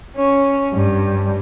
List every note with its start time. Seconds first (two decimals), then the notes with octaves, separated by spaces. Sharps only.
0.17 C#4
0.73 G2